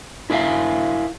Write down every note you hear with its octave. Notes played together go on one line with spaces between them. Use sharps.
E4 A#4 E5 F5